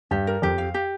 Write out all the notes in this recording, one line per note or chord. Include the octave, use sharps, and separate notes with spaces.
G2 G4
A#4
F2 G4
F5
G4